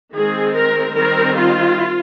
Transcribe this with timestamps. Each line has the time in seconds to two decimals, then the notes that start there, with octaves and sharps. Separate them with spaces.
0.16 D#3 G#3 C4 G#4
0.55 A#4
0.95 D#3 G3 C4 A#4
1.35 F4